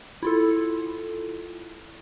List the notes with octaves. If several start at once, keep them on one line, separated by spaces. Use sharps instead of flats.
E4 F4 A4